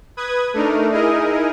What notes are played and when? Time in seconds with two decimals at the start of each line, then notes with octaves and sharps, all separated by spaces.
0.17 B4 D#6 G#6
0.54 A3 D4 D#4 A#4
0.91 D#4 E4 G#4 A#4 D#5